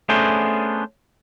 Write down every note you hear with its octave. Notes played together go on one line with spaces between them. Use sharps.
A3 B3 C#4 D4 G#4 C5